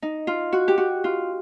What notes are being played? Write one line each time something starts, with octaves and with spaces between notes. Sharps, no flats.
D#4
F4
F#4
G4
F#4
F4